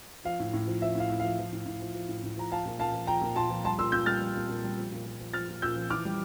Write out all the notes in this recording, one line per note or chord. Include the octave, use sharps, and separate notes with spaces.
F3 F5
A2
A2
F3
F3 E5
A2 F5
A2
F3 F5
F3
A2
A2
F3
F3
A2
A2
F3 A#5
F3 F5 A5
A#2
A#2 F5 A5
F3
F3 G5 A#5
A#2
A#2 A5 C6
F3
G3 A5 C6
A#2 C6 E6
A#2 E6 G6
G3 F6 A6
G3
A#2
A#2
G3
F3
A#2
A#2
F3
F3 F6 A6
A#2
A#2 E6 G6
F3
E3 D6 F6
G3